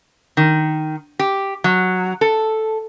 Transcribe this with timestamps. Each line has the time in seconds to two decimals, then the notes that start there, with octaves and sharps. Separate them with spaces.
0.37 D#3
1.19 G4
1.64 F#3
2.21 A4